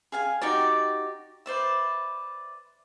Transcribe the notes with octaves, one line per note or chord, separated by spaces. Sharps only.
G#4 F5 G#5
D#4 F#4 G4 D5
B4 C5 D5 E5